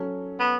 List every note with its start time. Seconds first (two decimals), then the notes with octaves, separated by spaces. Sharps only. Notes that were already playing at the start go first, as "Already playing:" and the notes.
Already playing: F#3 C#4 A4
0.40 B3